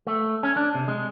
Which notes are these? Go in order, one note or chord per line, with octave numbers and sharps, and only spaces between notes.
A3
C#4
D4
C3
G#3